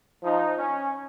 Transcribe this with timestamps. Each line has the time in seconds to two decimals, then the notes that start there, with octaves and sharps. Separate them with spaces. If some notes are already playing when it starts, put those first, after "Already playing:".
0.23 F3 D#4
0.58 C#4